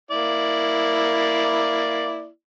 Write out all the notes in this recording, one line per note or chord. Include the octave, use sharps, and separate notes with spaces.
A#3 E4 D5